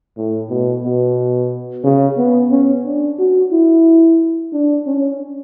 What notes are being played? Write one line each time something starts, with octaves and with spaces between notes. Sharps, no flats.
A2
B2
B2
C#3
B3
C#4
D4
F#4
E4
D4
C#4